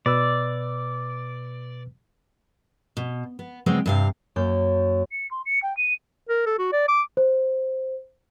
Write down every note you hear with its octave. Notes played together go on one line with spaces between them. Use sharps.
B2 B4 D5 E6
B2
B3
C#3 F#3 G#3 B3 C4
G2 C3 F5
F#2 A#3 G6
C#7
C6
C#7
G5
D#7
A#4
A4
F#4
D5
D6
C5